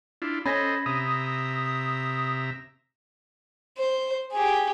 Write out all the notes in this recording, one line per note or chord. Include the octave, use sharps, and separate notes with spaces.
D4 E4 F4
C#4 A4 C5 D#5 B5 G#6 A#6
C3 E5 A#5 D#6
C5
G4 G#4